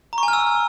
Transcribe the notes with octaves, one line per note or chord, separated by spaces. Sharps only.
A#5
C#6
G#5
F6
E6